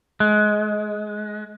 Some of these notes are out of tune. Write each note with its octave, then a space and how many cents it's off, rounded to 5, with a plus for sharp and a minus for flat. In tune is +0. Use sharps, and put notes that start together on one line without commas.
G#3 +20